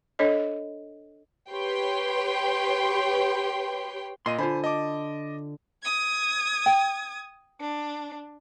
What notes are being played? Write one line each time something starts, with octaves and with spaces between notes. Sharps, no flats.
D4 A4 C#5 D#5
G4 B4 C#5 G5 C6
A#2 D#5 C6 D#7
D3 F4 C5 G#5 B5
D#5 A5 D6
D#6 G#6
G5
D4